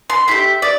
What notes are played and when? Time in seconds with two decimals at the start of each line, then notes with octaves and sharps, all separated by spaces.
0.10 C6
0.27 A3 E4 E5
0.31 G4
0.62 D5